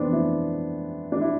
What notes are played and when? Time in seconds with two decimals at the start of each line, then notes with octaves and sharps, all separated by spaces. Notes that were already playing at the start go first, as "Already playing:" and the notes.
Already playing: F2 C3 E3 B3 C4 D4
0.13 E4
1.12 D4
1.21 E4